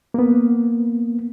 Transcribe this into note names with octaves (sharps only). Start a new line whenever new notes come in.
A#3 B3